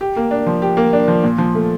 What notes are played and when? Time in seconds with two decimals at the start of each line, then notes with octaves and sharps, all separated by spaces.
0.01 G4
0.16 A#3
0.31 D4
0.46 F3
0.62 G4
0.77 A#3
0.93 D4
1.08 F3
1.23 A#2
1.38 F3
1.55 A3